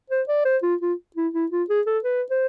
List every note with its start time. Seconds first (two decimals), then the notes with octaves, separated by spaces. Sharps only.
0.10 C5
0.28 D5
0.45 C5
0.63 F4
0.81 F4
1.16 E4
1.34 E4
1.51 F4
1.69 G#4
1.86 A4
2.04 B4
2.31 C5